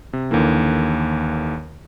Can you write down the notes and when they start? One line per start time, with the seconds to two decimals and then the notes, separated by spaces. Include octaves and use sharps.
0.13 C3
0.31 D#2 D3 E3 A#3